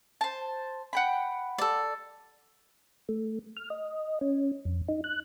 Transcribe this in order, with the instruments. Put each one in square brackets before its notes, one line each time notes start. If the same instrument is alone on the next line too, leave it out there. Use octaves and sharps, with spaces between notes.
[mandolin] C5 A5
F#5 G5 B5
[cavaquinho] A4 D5
[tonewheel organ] A3
F6
D#5
C#4
F2
D#4
F#6